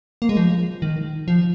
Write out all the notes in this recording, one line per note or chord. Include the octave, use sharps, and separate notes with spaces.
A#3
G#3
F3
D#3
F3